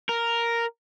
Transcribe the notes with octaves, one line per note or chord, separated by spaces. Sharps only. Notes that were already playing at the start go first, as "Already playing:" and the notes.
A#4